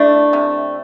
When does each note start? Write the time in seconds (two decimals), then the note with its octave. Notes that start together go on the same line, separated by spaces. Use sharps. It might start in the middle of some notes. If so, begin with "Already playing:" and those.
Already playing: A3 D4 E4
0.33 C3